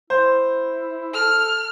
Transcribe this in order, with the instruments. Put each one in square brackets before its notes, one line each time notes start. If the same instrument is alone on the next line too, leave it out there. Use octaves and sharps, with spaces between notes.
[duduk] E4 [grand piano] C5
[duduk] A4 [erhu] F6